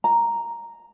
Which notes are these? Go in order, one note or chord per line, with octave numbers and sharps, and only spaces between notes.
A#5